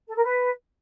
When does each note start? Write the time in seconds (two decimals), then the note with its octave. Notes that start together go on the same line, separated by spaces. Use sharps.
0.07 A4
0.16 A#4
0.24 B4